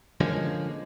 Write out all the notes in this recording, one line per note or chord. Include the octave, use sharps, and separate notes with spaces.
D3 F3 G#3 A#3 C#4